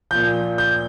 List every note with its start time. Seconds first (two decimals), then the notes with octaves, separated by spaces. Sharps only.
0.11 A#2 F3 G6
0.58 G6